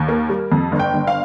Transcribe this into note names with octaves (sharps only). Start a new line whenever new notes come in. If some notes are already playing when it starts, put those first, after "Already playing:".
Already playing: D#2
A#3
G3
F2
G1
G5
G1
F5